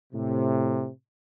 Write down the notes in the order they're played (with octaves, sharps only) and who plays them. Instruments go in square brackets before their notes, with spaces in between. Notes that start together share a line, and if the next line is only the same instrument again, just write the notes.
[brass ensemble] A2 C3